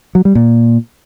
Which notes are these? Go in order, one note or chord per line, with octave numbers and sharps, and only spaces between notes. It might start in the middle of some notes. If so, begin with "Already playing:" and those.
F#3
G3
A#2